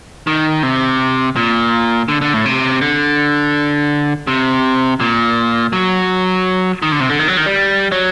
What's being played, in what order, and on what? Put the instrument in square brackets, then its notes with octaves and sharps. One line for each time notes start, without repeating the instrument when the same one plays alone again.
[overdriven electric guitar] D#3
C3
A#2
D3
D3
A2
C3
D3
C3
A#2
F#3
D#3
D3
C3
D3
D#3
F#3
D#3
G3
F#3